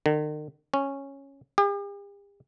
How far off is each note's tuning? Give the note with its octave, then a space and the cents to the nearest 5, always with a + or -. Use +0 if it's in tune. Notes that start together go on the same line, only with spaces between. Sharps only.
D#3 -45
C#4 -10
G4 +45